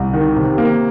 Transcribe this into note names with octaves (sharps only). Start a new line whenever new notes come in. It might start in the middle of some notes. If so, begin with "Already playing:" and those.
Already playing: C2
D#3
C3
A#3